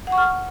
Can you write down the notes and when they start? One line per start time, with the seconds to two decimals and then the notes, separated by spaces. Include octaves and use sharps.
0.07 F#5
0.12 C#6
0.18 F6